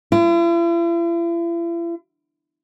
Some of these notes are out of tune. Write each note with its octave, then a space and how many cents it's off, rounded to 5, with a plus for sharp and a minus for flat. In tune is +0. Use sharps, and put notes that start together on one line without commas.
E4 +45